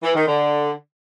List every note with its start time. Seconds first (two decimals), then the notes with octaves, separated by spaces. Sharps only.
0.03 E3
0.15 D#3
0.27 D3